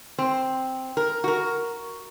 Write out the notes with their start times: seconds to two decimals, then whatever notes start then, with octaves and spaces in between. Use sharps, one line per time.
0.18 C4
0.97 A#4
1.24 F#4 A#4